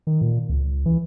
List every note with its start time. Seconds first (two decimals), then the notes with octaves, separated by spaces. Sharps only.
0.07 D#3
0.21 A#2
0.49 C#2
0.85 E3